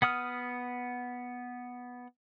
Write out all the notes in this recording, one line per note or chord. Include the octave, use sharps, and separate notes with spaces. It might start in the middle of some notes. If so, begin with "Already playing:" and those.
B3 F#5 D#6 F6